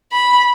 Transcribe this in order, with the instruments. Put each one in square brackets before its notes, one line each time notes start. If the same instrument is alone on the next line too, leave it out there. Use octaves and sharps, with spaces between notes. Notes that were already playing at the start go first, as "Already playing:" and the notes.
[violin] B5